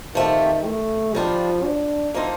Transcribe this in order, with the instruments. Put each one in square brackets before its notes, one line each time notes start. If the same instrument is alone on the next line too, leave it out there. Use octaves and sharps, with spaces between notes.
[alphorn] D#3 [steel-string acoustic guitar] F3 A3 C4 G4
[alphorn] A3
[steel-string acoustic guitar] D#3 G3 D4 F4 [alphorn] F3
[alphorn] D4
[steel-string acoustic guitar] F3 A#3 D#4 A4 C5